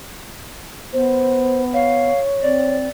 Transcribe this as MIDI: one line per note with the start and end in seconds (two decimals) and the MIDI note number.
0.93 2.10 59
0.93 1.63 72
1.73 2.76 73
1.73 2.20 77
2.42 2.88 60
2.42 2.89 74